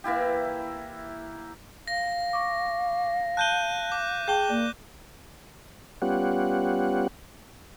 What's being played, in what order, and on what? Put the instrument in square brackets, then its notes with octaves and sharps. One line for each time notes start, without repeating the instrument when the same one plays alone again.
[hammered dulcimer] E3 A#3 E4 G4
[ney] F5 [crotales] A#6
[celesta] C#6 D6
[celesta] A5 G7 [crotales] F#6 G6 D#7
[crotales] D6
[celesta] G#4 G5 A5 [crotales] G6 G7
[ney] A#3 [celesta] D5
[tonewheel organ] G3 B3 C#4 F4 G4 F#5